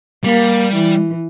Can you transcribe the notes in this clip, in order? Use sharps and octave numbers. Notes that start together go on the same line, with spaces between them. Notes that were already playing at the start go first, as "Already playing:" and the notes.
G3 A#3
E3